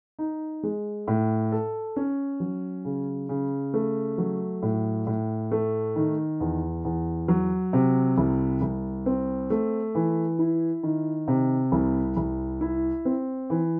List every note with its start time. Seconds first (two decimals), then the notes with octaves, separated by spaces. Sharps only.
0.19 D#4
0.63 G#3
1.08 A2
1.52 A4
1.96 C#4
2.40 F#3
2.85 C#3
3.29 C#3
3.74 A3
4.18 F#3
4.62 A2
5.07 A2
5.51 A3
5.96 D#3
6.40 E2
6.85 E2
7.28 F#3
7.73 C3
8.18 C2
8.61 C2
9.06 C4
9.50 A3
9.95 E3
10.39 E4
10.83 D#3
11.28 C3
11.72 C2
12.17 C2
12.61 E4
13.05 C4
13.50 E3